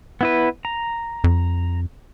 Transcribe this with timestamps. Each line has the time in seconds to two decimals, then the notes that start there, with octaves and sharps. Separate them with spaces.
0.21 B3 E4 B4
0.65 A#5
1.24 F2